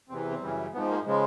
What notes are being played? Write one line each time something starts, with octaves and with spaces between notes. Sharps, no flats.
E2 C3 E3 C4
C4
F#2 C#3 E3 G3
G#2 F3 B3
A#3
C#3 F3 G#3